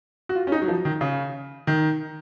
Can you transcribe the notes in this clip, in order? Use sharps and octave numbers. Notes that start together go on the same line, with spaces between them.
F#4
F4
C#4
D#4
F#3
F3
D#3
C#3
D#3